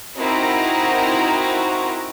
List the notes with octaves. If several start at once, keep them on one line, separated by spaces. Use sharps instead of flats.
C4 D#4 E4 F#4 A#4 A#5